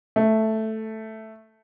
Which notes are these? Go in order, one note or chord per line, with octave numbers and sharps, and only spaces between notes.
A3